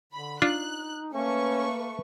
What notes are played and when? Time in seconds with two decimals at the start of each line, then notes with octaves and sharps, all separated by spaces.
0.13 D3 B5
0.42 D4 D#4 F4 F#6
1.13 A3 A#3 C#4 B4 C#6